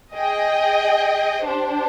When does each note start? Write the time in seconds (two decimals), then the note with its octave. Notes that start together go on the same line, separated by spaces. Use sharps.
0.15 G#4 D#5 G5
1.46 D4 G4 C5